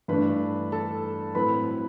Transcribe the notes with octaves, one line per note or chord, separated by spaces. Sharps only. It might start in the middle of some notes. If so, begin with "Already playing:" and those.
G2 E3 A3 D4 B4 B5
A4 A5
A2 F#3 C4 B4 B5